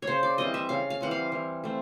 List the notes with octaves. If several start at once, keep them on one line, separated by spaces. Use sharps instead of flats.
C#5
C#3 C5
D5
E3 G3 C4 D#5
E5
C#3 F5
F5
E3 G3 C4 F#5
F5
E3
A3 C4